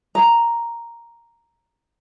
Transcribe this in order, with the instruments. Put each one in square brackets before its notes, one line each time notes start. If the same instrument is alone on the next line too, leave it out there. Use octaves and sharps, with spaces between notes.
[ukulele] A#5